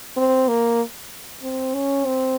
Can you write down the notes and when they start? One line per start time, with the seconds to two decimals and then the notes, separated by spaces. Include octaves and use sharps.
0.17 C4
0.48 A#3
1.42 C4
1.74 C#4
2.06 C4